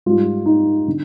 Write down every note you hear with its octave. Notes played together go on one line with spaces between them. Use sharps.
G#2 G3 F4
D#4
D3